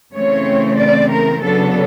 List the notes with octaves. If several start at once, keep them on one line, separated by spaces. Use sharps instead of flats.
C#3 E3 A3 C4 C#5
D5
A#4
C#3 F#3 B3 D4 A4